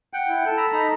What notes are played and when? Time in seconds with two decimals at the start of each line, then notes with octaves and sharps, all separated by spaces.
0.13 F#5 G5
0.27 E4
0.46 A4
0.57 A#5 B5 E6
0.73 D#4 A#5 B5